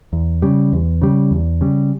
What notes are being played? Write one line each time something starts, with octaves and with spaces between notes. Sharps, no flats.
E2
C#3 G3
E2
C#3 G3
E2
C#3 G3